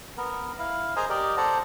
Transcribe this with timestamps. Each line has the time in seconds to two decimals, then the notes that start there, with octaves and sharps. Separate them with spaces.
0.18 B3 A#4
0.59 E4 F5
0.96 G#4 A#4 C5 D#5 G#5 A#5
1.10 G4 A#4 D5 D#5
1.37 A4 C5 D5 F#5 A5 A#5